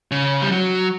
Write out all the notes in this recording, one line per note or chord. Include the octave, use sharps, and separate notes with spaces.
C#3
G3
F#3